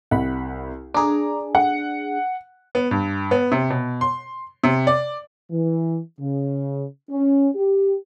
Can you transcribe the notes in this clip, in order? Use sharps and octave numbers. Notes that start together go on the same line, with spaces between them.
C2 F#5 B5
D4 G#4 A#5 D6
F#5
B3
G2
B3
C3
B2
C6
C3
D5
E3
C#3
C#4
G4